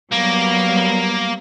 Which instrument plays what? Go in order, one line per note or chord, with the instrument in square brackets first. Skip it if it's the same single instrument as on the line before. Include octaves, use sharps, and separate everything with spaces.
[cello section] F#3 G3 B3 [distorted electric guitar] A#3